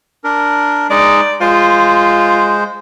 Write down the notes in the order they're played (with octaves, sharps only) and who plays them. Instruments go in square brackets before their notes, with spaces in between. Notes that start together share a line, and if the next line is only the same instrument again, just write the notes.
[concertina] D4 A#4
[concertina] G#3 D#4 D#5 [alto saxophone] D5
[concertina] G#3 C5 [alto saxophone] F4